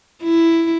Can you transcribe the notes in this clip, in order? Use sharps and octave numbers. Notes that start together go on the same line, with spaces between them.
E4